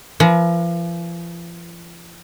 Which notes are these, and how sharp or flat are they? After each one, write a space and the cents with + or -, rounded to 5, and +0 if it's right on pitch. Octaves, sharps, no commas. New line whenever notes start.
F3 -40 B4 -45